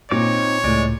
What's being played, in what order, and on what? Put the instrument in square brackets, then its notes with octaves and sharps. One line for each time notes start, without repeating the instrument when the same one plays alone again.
[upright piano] A#2 [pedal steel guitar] C4 D#4 D6 [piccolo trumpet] C#5
[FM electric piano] C#2 A2 [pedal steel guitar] G#3 D5